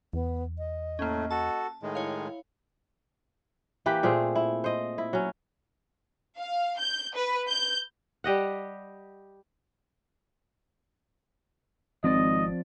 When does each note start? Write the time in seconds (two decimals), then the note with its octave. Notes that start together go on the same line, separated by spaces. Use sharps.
0.13 E2 B3
0.58 D#5
0.99 A2 A3 A#3 C#4
1.31 F#4 A4 A5
1.82 A2 D#3 G#3
1.95 E4 C#5 F5
3.86 E3 A#3 G4 B4
4.03 A#2 A3 C4 G#4
4.36 E4
4.64 C5 D#5
4.98 E4
5.13 F#3 C#4
6.38 F5
6.78 G6
7.15 B4
7.48 G6
8.24 G3 G4 D#5 F#5
12.04 G#1 F3 C4 D5 D#5